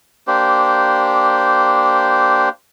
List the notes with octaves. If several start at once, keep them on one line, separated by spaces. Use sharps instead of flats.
A#3 D4 G4 C5